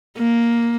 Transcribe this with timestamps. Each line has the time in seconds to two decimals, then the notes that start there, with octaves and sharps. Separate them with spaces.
0.18 A#3